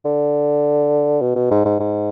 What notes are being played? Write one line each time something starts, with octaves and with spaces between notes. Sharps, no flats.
D3
B2
B2
G#2
G#2
G#2